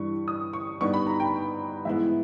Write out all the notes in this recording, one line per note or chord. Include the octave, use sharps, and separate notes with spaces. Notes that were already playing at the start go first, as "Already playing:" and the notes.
Already playing: G2 E3 G3 C#6
D#6
C#6
G2 G3 B3 D#4 C#6
B5
A#5
G5
G#2 E3 G#3 B3 E4 E5